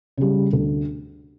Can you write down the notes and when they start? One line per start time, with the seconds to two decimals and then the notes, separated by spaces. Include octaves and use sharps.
0.17 C#3 G3
0.53 D2